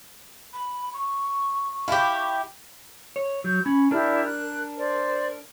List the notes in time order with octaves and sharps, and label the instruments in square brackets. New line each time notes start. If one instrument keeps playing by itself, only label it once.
[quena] B5
C#6
[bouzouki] E4 G4 [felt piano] F5 B5
[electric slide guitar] C#5
[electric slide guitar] F#3 [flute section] G6
[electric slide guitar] C#4 [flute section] B5
[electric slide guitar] D4 A#4 [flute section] E4 G4 D5
[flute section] F#6
C5 D5